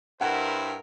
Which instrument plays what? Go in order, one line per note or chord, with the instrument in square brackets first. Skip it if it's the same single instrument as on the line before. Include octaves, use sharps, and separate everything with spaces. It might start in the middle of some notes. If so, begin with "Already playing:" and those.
[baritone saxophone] G2 [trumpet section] E4 C5 [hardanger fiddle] A#4 [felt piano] F#5